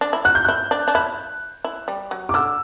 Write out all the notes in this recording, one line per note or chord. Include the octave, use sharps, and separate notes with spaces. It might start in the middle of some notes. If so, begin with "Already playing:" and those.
D4
E4
F#4 F#6
G6
E4 F#6
D4
D4
E4 F#6
E4
G3
F#3
D6
D3 E6